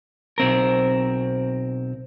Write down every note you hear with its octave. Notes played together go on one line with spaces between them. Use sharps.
B1 C4 A#4